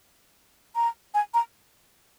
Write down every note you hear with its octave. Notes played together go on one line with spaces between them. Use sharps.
A#5
G#5
A#5